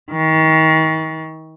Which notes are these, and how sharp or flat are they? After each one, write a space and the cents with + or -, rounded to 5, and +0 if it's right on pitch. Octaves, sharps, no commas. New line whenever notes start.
D#3 +35